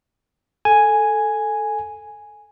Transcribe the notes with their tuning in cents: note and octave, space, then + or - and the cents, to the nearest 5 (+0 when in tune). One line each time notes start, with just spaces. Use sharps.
A4 +0 G#5 +0